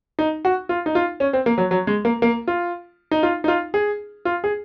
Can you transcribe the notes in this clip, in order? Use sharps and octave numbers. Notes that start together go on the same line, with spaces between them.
D#4
F#4
F4
D#4
F4
C#4
C4
A#3
F#3
F#3
G#3
A#3
A#3
F4
D#4
F4
D#4
F4
G#4
F4
G#4